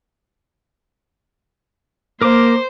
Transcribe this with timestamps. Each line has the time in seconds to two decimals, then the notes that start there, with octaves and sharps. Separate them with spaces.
2.21 A#3 A#4 C5 D6